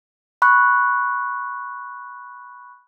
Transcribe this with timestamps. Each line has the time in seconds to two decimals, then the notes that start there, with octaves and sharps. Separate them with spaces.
0.42 B5 C#6 F#6